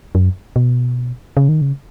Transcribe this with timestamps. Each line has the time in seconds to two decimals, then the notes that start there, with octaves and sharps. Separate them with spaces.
0.15 F#2
0.56 B2
1.37 C#3
1.49 D#3
1.61 C#3